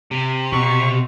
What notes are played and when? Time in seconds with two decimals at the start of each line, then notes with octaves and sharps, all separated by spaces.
0.11 C3
0.52 B2 C#6